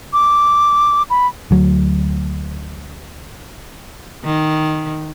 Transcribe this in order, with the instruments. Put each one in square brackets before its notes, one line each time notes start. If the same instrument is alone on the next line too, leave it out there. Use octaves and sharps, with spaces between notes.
[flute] D6
B5
[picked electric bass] D2 F#3
[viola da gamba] D#3